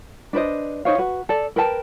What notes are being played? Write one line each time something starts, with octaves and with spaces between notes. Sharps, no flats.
D4 B4 C5 D#5
D#4 C5 C#5 F5
F#4 B4
A4 D5
A#4 B4 G5 A5